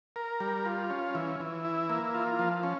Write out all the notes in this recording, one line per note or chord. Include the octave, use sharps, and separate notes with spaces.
A#4
G3
F4
C#4
E3
E3
E4
A#3
F4
F3
C#4